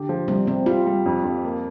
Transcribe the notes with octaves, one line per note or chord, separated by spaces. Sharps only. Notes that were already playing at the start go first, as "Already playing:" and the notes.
Already playing: D3 G4
F3
C3 G3
C3 C4
G3 F4
G3
F2
F2
A#3